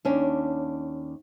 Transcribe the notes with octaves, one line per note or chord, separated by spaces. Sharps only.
D#2 C#4 D4